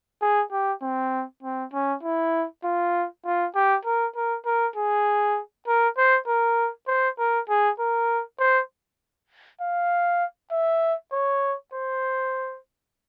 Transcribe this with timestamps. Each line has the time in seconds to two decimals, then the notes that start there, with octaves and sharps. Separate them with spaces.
0.22 G#4
0.52 G4
0.82 C4
1.43 C4
1.73 C#4
2.03 E4
2.64 F4
3.25 F4
3.55 G4
3.85 A#4
4.16 A#4
4.46 A#4
4.76 G#4
5.67 A#4
5.97 C5
6.27 A#4
6.88 C5
7.18 A#4
7.49 G#4
7.80 A#4
8.40 C5
9.61 F5
10.52 E5
11.12 C#5
11.74 C5